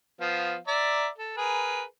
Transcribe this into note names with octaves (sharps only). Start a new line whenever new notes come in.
F3 B3 F5
D5 E5 A#5
A4
G#4 A#4 B4